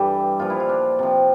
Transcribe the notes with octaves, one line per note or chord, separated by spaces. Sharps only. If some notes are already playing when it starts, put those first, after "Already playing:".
Already playing: G2 E3 G3 D4 G4 A4
A#2 F3 F4
E4
F4
D4
C3 F3